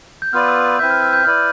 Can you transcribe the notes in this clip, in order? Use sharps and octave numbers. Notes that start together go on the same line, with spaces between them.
G6
B3 F4 B4 D5 F6
E6
C4 E4 B4 E5 G6
F6
F6
G6
E4 B4 D5 F6